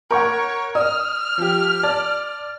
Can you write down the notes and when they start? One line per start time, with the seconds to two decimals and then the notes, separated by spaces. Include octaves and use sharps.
0.11 A#4 C#5 F#5 C#6 G6
0.75 D5 D#6 F6
1.38 F3 G4
1.83 D5 A5